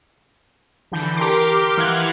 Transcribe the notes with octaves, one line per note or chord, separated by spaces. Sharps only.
D3 E3 G6
G4 A#4 C6 D6
E3 F5 F#5 C6 F#6 G#6